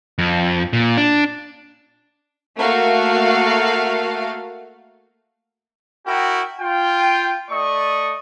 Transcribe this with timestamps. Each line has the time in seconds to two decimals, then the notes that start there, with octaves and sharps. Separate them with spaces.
0.18 F2
0.73 A#2
0.97 D4
2.59 A3 A#3 F#4 F5
6.06 E4 F#4 A#4 G5
6.61 F4 G5
7.50 A3 D5 D#5 C#6 D#6